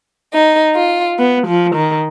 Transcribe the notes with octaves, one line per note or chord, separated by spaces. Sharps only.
D#4
F4
B3
F3
D#3